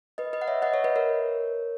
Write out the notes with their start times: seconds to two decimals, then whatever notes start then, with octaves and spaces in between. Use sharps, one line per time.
0.18 B4 D#5
0.33 B4 D#5
0.42 F#5
0.48 C#5 E5
0.62 D#5 F#5
0.74 C#5 E5
0.84 B4 D#5
0.96 A#4 C#5